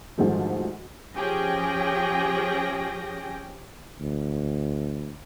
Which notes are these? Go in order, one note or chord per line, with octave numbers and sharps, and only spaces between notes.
D2 G#2 D#3 F3 G3 A3
F3 C#4 G4 G#4 G5 A#6
D2